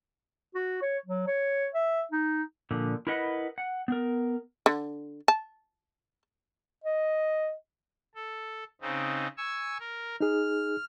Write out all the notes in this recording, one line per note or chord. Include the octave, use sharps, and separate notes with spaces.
F#4
C#5
F#3
C#5
E5
D#4
A#2 D3 F3
E4 A#4 B4 D#5 F#5
F#5
B3 A#4
D3
A5
D#5
A4
C#3 C4 D#4
G#5 C#6 E6
A#4
D#4 G#4 F6